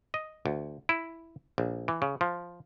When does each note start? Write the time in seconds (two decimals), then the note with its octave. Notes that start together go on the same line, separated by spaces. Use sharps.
0.14 D#5
0.46 D2
0.89 E4
1.58 A#1
1.88 E3
2.02 C#3
2.21 F3